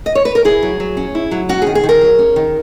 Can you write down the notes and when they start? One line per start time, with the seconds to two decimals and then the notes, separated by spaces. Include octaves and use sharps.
0.06 D#5
0.15 C#5
0.25 B4
0.35 A#4
0.45 E4 G#4
0.62 F#3
0.80 F#3
0.97 C#4
1.15 E4
1.31 F#3
1.49 C#4 F#4
1.62 G#4
1.67 D#3
1.75 G#4
1.84 D#3
1.89 A#4
2.01 F#3
2.19 C#4
2.36 D#3